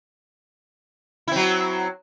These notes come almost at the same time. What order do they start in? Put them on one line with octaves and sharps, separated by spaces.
E4 C4 F#3